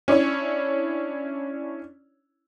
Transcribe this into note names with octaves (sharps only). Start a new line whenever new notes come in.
C#4 D4 E4 C#5